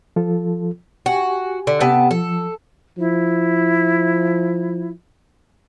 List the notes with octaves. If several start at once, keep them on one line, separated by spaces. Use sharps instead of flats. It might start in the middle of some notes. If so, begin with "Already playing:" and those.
F3 F4 A4
F#4 G4 G#5
D3
C3 B3 A5
F3 A4
F3 E4